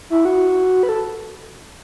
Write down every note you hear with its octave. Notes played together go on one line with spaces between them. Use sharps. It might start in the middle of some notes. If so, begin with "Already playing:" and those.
E4
F#4
B4
A4